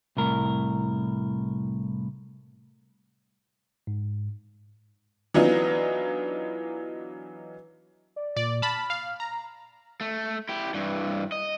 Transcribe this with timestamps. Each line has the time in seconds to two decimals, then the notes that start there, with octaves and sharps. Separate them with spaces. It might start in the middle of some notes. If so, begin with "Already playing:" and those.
0.17 C2 A2 A#4
3.87 G#2
5.34 E3 F#3 B3 D4 D#4 F4
8.16 D5
8.36 A#2 D5
8.62 A5 B5 F6
8.90 F5
9.20 A#5
10.01 A3
10.49 E4 G4
10.74 G2 E3
11.32 D#5